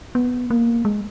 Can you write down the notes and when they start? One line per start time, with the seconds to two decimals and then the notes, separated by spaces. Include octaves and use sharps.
0.15 B3
0.50 A#3
0.85 G#3